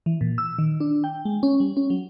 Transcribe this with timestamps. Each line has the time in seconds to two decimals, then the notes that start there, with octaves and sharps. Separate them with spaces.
0.06 E3
0.21 A#2
0.38 E6
0.58 D#3
0.80 D4
1.04 G5
1.25 G#3
1.43 C#4
1.60 G3
1.77 C#4
1.90 F#3